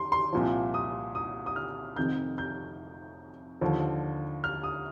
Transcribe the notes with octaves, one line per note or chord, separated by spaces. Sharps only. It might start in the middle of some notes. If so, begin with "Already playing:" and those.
Already playing: C6
C6
C2 A#2 F3
D#6
D#6
D#6
F6
F1 F2 C3 D#3 G6
G6
D#2 D3 F3
F6
D#6